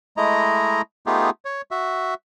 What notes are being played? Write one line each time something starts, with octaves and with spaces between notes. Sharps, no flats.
G#3 A3 E4 D#5 A#5
A3 B3 D#4 F4 G4 G#4
C#5
F#4 E5